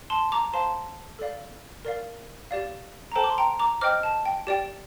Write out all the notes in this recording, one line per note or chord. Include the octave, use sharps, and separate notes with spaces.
A5 C6
A#5 D6
C5 F5 A5 C6
A4 D5 F5
A#4 D5 F5
G4 D5 F5
A#5
A4 C5 G5 A5
D6
C6
G5 A#5
A#5 D6
C5 D#5 G5 D6 F6
A5
G5
G4 D5 G5